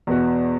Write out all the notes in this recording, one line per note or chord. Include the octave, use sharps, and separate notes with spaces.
E2 B2 B3 F#4